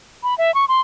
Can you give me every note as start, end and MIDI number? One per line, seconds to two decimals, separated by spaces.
0.23 0.37 83
0.38 0.54 76
0.54 0.65 85
0.68 0.81 84